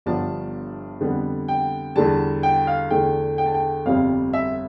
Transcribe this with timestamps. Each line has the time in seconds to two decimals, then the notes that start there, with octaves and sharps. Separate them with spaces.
0.06 G1 G2 F3 B3 D4 A5
1.01 F2 D3 G3 B3
1.48 G5
1.96 E2 D3 G3 A5
2.43 G5
2.67 F5
2.90 E2 D3 A3 D4 G5
3.38 G5
3.46 A5
3.54 G5
3.86 G1 F2 C3 G3 F5
4.33 E5